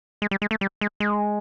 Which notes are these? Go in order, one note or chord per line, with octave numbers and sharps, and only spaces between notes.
G#3
G3
G#3
A3
G3
G#3
G#3